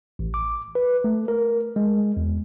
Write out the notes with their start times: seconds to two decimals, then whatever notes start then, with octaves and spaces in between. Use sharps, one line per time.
0.19 A1
0.34 D6
0.75 B4
1.04 A3
1.28 A#4
1.76 G#3
2.17 E2